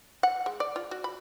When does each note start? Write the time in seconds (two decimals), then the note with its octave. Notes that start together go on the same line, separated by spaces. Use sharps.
0.23 F#5
0.46 G#3
0.60 D5
0.76 F4
0.91 F#4
1.04 B5